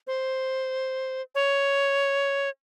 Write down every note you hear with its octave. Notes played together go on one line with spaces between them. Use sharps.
C5
C#5